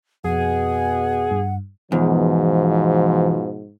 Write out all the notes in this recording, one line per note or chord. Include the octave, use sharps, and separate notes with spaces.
F2 B2 G#4 F#5
G2
E2 G#2 B2 F3